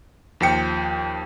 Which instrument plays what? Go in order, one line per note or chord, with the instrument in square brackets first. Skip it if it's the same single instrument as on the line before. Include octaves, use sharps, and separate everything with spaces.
[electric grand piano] D#2 F3 G5 C#7